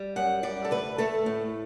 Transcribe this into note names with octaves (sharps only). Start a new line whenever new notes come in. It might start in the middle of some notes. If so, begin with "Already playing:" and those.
Already playing: G3
F#2 F#5
G3 D5
A4
D2 B4
A3 A4
A2